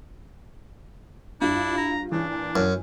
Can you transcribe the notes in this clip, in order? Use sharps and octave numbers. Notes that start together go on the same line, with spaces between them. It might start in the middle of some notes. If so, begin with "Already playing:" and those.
G2 D4 E4 F4
A#5
C#3 E3 D4
A#2
F#2